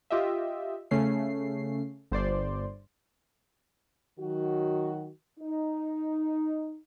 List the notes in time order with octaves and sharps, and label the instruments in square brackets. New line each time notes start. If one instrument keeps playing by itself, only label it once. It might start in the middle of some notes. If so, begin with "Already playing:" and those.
[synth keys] F4 G4 D#5 E5
C#3 A3 C#4 C7
G1 C5 D5 C6
[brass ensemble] D#3 F#3 F#4
D#4